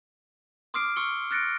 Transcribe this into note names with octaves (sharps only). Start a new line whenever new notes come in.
C6 D6 D#6 F6 C7 D7
C6 C#6 E6 C#7 G7
F6 F#6 A6 A#6 C#7 D7